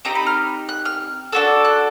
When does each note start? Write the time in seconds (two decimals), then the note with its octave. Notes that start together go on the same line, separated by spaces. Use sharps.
0.05 C4 D#4 G4 A#5
0.15 B5
0.26 F6
0.69 F#6
0.85 F6
1.32 D4 F#4 A4 E6
1.65 F#6